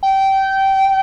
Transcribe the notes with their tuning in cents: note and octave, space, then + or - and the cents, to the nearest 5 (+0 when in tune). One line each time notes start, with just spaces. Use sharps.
G5 -20